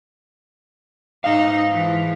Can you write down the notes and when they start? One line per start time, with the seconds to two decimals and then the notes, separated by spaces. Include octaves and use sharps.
1.24 G#2 D#4 F5
1.71 E3 F3